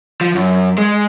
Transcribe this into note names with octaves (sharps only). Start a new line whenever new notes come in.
F3
F#2
G#3